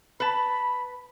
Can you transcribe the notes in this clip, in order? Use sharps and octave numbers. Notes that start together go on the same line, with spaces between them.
B4 A5 B5